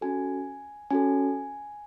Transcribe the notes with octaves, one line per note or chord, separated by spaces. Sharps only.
C#4 F#4 A4 G#5
C#4 F#4 A4 G#5